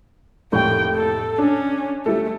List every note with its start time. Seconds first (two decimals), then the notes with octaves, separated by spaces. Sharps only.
0.52 F1 A2 A#3 G5 C#6
0.96 A4
1.38 C#4 D4
2.06 G3 A3 E4 A4